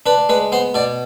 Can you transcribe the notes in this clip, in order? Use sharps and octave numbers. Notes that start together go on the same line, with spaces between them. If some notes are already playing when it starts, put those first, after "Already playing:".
D4 B4
G#3 B4
B3 C5
B2 D5